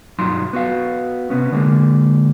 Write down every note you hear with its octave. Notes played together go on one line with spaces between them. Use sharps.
B1 G2 F#3 D#4 F4 C6
B3 F#4 F5
C3 B3 C#4
D3 G#3 A#3